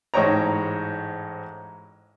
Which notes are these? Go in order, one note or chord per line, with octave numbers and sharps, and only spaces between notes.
A1 G#2 C5 C#5 G5 A#5